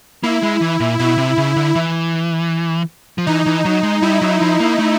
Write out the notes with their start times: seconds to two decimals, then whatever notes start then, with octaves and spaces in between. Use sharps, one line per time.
0.23 A#3 E4
0.43 G#3
0.62 E3
0.80 A#2
0.99 B2 E4
1.18 C3
1.37 C#3
1.56 D3
1.75 E3
3.18 F3
3.27 E3 D#4
3.46 E3
3.65 F#3
3.83 G#3
4.02 G3 E4
4.22 F#3
4.41 F3
4.60 A#3
4.79 A3